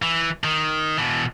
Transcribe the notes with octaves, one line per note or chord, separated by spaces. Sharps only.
E3
D#3
B2 E3